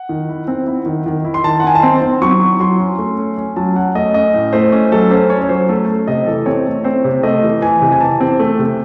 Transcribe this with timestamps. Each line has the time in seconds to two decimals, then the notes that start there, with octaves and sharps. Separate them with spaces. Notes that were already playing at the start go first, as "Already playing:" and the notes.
Already playing: F#5
0.09 D#3
0.29 E4
0.48 C4
0.67 E4
0.86 D#3
1.06 D#3
1.25 E4
1.34 C6
1.44 D#3 A5
1.60 F#5
1.64 D#3 G#5
1.75 A5
1.82 C4 C6
2.02 C4
2.22 F#3 C#6
2.40 E4
2.60 F#3 C6
2.79 C#4
2.98 A3
3.17 C#4
3.38 C#4
3.56 F#3 A5
3.76 C#4 F#5
3.95 A3 D#5
4.14 C#4 D#5
4.34 A2
4.53 A3 C5
4.72 C#4
4.92 F#3 A4
5.11 C#4 C5
5.30 C#4 C#5
5.41 C#5
5.49 F#3 C5
5.69 A3 A4
5.89 A3
6.07 C3 D#5
6.27 E3 A4
6.46 C4 C#5
6.66 A3
6.84 C4 C5
7.04 C3
7.23 A3 D#5
7.42 E3
7.62 E3 G#5
7.81 C3
7.92 G#5
8.00 E3 A5
8.21 C4
8.40 A3
8.59 C3